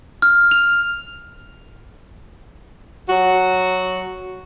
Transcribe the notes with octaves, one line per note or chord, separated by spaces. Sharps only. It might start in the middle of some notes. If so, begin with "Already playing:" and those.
F6
F7
F#3 F#4